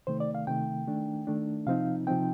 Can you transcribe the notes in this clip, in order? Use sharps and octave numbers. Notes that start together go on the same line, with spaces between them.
C3 D#3 A3 C5
D5
F5
C3 D#3 A3 G5
D#3 A3 D4
D#3 A3 D4
C3 F3 C4 D#4 F5
C3 F3 C4 D#4 G5